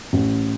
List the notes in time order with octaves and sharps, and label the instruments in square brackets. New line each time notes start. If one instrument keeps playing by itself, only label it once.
[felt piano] A1